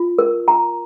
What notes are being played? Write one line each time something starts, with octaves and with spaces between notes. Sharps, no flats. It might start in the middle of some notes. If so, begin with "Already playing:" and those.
Already playing: F4
A#4
A#5